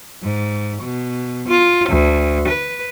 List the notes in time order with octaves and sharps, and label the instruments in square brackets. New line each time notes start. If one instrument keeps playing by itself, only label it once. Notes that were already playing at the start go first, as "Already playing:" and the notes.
[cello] G#2
B2
F4
D2
B4